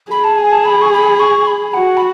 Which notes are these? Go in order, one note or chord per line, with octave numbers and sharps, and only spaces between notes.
G#4 B5
A5
G#5
A5
B5
C#6
B5
C#6
B5
F#4 F#5
B5